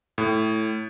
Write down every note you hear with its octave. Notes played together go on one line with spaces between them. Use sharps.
A2